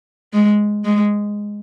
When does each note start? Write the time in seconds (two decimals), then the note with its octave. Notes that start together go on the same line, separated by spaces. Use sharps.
0.33 G#3
0.85 G#3